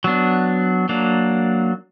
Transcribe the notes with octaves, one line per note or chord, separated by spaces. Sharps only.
F#3 B3 D4
F#3 A#3 D4